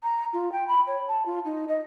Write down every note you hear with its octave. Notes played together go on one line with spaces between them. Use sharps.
A#5
F4
G5
B5
C#5
A5
F4
D#4
D#5